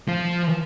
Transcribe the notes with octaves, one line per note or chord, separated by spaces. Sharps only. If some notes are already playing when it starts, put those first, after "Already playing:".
F3